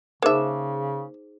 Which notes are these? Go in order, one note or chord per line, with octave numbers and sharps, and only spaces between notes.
C#3 A#3 D#4 G#4 C5 E5